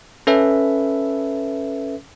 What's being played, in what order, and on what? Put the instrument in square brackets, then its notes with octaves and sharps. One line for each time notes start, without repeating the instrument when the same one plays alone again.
[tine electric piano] C#4 A4 B4 E5